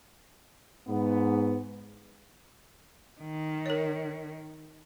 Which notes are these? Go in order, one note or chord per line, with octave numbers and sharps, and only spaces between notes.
G#2 B3
D#3
A#4 C#5